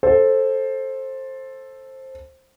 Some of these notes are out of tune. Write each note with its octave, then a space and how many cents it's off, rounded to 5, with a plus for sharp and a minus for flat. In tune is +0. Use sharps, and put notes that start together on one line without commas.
A4 +0 C5 +15